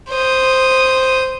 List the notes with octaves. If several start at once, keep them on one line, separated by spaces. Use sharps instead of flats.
C5 D#6